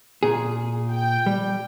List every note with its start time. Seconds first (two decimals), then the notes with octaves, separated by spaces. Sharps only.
0.23 A#2 G#4
0.93 G5
1.26 G3